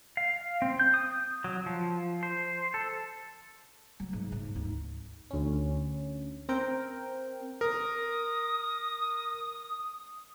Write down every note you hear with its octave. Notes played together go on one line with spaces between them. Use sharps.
F5
C4
G6
D#6
F#3
F3
C5
A4
F#3
G#2
G#2
D2 D#4
D2 C#4
C4 A#4 G5
A#4 D#6